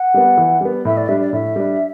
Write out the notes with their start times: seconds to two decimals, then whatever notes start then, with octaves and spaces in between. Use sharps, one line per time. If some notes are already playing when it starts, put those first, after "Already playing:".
Already playing: F#5
0.14 G3 B3
0.38 E3
0.61 G3 B3
0.85 A2 E5
0.97 D5
1.08 G3 D4 E5
1.21 D5
1.33 A2 E5
1.56 G3 D4